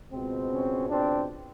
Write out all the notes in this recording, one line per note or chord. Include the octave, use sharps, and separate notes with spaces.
C#2 B2 G#3 C4
C#4
C4 D4